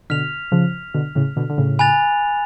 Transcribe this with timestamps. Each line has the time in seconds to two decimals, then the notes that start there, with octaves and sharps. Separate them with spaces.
0.10 B2 D3 F6 B6 F7
0.52 C#3 F3
0.94 B2 D3
1.15 A2 C#3
1.36 B2 D3
1.50 D3
1.58 A2 C#3
1.79 G#5 B5 F#6 A6 F7